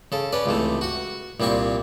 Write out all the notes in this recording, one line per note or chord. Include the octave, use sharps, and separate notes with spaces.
C#3 A4
C#4 B4 D5
C#2 C3 E3 A3
F#4 F#5
C2 A#2 C4 B5 C#6